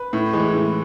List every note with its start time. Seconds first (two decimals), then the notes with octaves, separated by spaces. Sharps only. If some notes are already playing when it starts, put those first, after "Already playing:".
Already playing: B4
0.13 A2
0.33 E3 G#3
0.53 A2